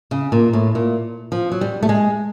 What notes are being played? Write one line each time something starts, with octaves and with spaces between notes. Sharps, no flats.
C#3
A#2
A2
A#2
F3
F#3
G3
A3
G#3